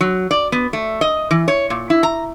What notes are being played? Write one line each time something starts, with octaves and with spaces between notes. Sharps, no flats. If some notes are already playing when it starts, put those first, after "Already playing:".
F#3
D5
B3
A3
D#5
E3
C#5
A#2
E4
A#5